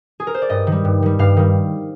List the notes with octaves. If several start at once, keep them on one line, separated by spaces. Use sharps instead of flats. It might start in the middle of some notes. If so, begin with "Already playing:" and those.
G#4
A#4
C5
D5
G2 D#5
D#3
G3
G2
D#3 G3
G2 F5
D#3 G3